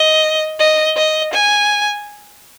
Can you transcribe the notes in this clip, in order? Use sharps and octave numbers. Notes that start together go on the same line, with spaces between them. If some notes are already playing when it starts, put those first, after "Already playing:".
Already playing: D#5
D#5
D#5
G#5